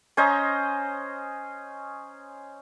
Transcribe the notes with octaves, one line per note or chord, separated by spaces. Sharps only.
C#4 C5 D#5 A#5